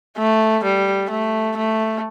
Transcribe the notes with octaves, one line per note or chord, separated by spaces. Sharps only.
A3
G3
A3
A3